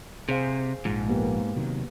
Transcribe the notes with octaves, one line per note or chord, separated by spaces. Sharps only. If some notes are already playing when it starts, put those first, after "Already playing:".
C3 G#4 C5 F5
A#1 G#2 F3
A#3 B3 G4
C3 D#3 F#3